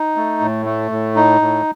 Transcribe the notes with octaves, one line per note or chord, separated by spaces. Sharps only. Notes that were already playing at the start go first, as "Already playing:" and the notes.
Already playing: D#4
A3
A2
A3
A2
D#4
A2